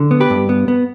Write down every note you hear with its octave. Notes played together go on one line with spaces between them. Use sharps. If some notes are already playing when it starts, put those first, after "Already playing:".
Already playing: D3
B3
G4 B4
G2
B3
B3